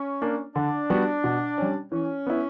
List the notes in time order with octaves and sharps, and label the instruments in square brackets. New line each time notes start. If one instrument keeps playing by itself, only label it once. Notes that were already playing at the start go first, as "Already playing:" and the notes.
Already playing: [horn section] C#4
[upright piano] A#3 D4
[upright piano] D3 [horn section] D4
[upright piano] G3 B3 F#4
B2
G3 C#4
[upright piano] E3 [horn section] C#4
[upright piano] B3 E4